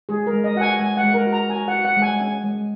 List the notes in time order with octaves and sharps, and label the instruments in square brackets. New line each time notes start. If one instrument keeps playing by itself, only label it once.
[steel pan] G#3 G#4
A#4
G#3
D#5
F#4 F#5
G#5
G#3 G#5
F#5
G#3
A#4
F#4
A#5
F#4 G#5
F#5
F#4
F#5
G#3
G#5
C#4 G#5
G#3